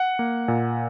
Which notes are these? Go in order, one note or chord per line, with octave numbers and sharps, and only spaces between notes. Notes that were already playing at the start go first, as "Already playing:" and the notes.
Already playing: F#5
A#3
A#2